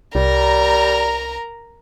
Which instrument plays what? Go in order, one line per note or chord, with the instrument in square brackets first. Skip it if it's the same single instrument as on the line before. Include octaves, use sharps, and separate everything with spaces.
[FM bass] C2 [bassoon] G3 [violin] A#4 A#5